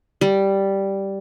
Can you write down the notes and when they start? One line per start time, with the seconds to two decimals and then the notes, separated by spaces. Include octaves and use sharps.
0.21 G3